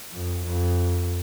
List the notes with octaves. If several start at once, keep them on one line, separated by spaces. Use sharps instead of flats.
F2
F2